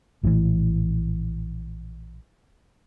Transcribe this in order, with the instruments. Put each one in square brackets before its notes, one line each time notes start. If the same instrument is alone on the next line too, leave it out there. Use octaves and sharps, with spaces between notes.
[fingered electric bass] A#1 A2 C#3 E3